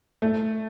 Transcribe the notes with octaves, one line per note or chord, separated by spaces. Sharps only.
A3